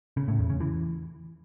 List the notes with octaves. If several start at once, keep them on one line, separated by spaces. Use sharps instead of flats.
C#3
A2
E2
C#3
E3